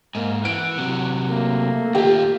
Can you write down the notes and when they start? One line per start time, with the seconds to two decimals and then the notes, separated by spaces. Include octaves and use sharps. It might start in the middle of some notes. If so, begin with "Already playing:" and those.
0.15 G#2 A#3
0.45 E3 F#5 D7
0.78 C3 F#3
1.28 A3 A#3
1.95 D#2 F4 G4